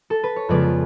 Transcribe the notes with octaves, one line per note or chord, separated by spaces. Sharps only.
A4
B4
C#5
F2 C#3 G#3 B3 B4 D5